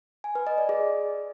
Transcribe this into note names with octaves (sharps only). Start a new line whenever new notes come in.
G#5
B4
D#5
D5
G#4